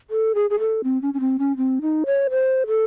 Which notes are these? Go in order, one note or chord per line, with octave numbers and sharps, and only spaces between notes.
A4
G#4
G#4
A4
C4
C#4
C#4
C4
C#4
C4
D#4
C#5
C5
A4